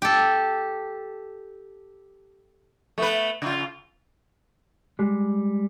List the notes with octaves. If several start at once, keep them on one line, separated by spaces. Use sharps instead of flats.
G4 A4
A3 B3 B4
C#3 F4
G3 G#3